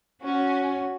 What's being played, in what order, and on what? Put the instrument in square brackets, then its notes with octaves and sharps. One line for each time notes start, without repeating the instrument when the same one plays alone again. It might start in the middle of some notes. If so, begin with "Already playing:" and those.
[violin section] C#4 [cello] F#4